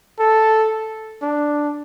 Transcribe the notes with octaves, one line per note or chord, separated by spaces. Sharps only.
A4
D4